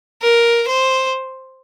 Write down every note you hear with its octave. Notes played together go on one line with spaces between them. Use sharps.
A#4
C5